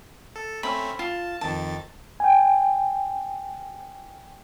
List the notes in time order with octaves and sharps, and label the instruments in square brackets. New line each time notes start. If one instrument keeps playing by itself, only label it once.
[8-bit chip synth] A4
[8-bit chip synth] A3 C4 C#4 [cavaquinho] B5
[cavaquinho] F4 [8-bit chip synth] A5
[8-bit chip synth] F2 D#3 A6 [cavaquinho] A5
[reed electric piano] G5 G#5